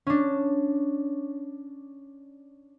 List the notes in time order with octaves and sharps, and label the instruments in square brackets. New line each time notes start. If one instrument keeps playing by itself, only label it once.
[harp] C#4 D4